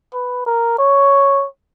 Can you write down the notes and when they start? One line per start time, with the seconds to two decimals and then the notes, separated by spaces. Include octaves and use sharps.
0.14 B4
0.46 A#4
0.79 C#5